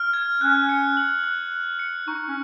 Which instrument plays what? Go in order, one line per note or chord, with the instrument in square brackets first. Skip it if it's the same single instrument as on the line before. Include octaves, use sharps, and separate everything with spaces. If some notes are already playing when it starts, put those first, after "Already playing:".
Already playing: [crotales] F6
G#6
[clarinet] C#4 [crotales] F#6
[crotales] C#7
F#7
F#6
F#6
C#7
[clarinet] D#4 [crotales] C#6
[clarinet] C#4